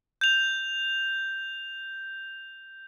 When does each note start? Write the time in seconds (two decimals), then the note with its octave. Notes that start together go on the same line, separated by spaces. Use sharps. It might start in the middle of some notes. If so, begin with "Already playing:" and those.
0.21 G6 F7